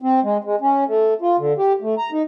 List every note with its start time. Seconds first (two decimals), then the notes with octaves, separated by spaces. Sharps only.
0.02 C4
0.24 G#3
0.44 G#3
0.61 C#4
0.88 A3
1.21 F4
1.38 D3
1.58 G4
1.82 A3
1.98 A#5
2.12 D#4